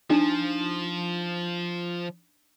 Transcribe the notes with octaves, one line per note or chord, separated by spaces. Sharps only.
F3 D4 D#4